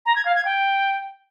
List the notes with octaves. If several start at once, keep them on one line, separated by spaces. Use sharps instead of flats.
A#5
G#6
F5
G#6
G5